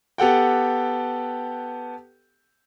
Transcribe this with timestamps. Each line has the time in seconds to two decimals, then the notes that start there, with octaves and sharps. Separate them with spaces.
0.18 B3 G4 A4 F#5 G5